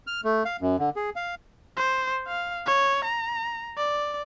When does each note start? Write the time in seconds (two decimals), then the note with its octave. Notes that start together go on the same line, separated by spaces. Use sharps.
0.07 F6
0.24 A3
0.45 F5
0.61 F#2
0.79 D3
0.96 G#4
1.16 F5
1.77 C5
2.28 F5
2.66 C#5
3.05 A#5
3.77 D5